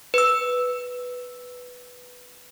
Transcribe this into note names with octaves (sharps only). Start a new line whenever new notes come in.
B4 E6